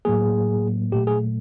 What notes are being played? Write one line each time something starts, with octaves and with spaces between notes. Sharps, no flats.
A2 F#3 A#3 G#4
A#2 F#3 A3 G4
G#4